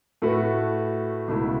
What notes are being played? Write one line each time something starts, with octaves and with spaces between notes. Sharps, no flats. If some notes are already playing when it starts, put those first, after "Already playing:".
A2 A3 F#4 B4
C#2 B2 A3 E4